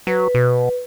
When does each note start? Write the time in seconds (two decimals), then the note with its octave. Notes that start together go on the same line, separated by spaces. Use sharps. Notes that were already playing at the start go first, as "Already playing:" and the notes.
0.07 F#3 B4
0.35 B2